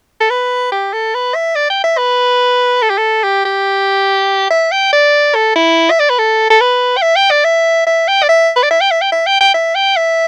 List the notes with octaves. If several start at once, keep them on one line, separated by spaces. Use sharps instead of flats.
A4
B4
G4
A4
B4
E5
D5
G5
E5
B4
A4
G4
A4
G4
G4
E5
G5
D5
A4
E4
E5
D5
B4
A4
A4
B4
G5
E5
G5
D5
E5
E5
G5
D5
E5
B4
D5
E5
G5
E5
G5
E5
G5
G5
E5
G5
E5